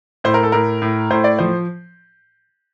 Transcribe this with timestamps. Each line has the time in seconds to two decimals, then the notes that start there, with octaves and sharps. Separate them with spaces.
0.24 A2 C5
0.34 A#4
0.43 A4
0.52 A2 A#4
0.82 A2
1.10 A2 C5
1.24 D5
1.39 F3 C5